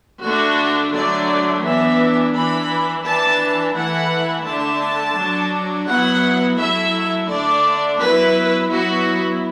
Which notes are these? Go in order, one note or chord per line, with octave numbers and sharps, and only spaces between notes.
D3 A3 D4 F#4
D3 F#3 A3 D4 D5
E3 B3 D4 E5
E3 D4 B5
E3 D4 A5
E3 A3 E4 F#5
D3 A3 D4 A5
F#3 D4
F#3 B3 E4 F#5
F#3 A3 E4 E5
D3 A3 D4 D5
F#3 B3 E4 B4
F#3 B3 E4 F#4